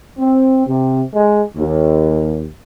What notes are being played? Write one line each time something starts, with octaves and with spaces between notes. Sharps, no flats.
C4
C3
G#3
D#2